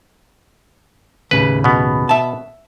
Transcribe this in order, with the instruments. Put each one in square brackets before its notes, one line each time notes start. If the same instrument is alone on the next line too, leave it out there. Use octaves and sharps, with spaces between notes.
[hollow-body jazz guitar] D#2 A2 C#3 [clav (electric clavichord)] B4
[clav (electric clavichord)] B2 B3
[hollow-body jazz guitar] E5 A5